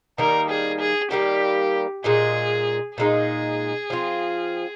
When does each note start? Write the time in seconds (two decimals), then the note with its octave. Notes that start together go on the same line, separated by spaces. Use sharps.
0.18 D#3 G3 A#3 A#4
0.50 G#4
0.80 G#4
1.11 D#3 G3 A#3 G4
2.04 A#2 G#3 D#4 G#4
2.98 A#2 G#3 D#4 G#4
3.90 F3 C4 F4